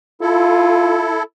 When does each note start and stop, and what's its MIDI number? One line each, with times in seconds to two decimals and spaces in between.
0.21 1.23 64
0.21 1.11 65
0.21 1.23 69